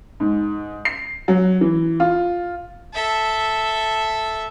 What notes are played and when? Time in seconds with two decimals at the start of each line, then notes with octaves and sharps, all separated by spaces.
0.20 G#2
0.85 C7
1.28 F#3
1.61 E3
2.00 F4
2.94 A4 E5